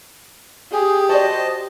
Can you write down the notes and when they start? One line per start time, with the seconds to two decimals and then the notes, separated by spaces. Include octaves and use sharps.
0.72 G4 G#4
1.09 F#4 C5 D5 D#5 A5